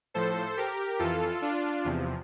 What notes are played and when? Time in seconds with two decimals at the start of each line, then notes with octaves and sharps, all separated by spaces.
0.14 A2 F3 A4 C5
0.57 G4 A#4
0.99 F2 E3 F4 A4
1.42 D4 F4
1.85 E2 C3 F3